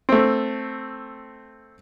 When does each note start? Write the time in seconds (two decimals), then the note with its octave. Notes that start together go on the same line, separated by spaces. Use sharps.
0.09 A3 C4